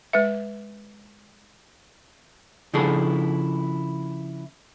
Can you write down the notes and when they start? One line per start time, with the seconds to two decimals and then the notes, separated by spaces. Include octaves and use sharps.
0.13 G#3 B4 E5
2.74 C#3 F3 D4 E4 G#4 A4